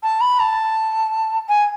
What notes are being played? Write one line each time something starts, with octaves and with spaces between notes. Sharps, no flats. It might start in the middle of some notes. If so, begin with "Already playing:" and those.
A5
B5
A5
G#5